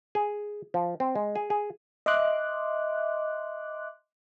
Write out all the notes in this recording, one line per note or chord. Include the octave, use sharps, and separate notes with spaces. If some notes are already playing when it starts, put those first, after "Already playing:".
G#4
F3
C4
G#3
G#4
G#4
D#5 E5 C6 D6 F#6